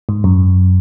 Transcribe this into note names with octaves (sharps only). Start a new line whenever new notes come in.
G#2
F#2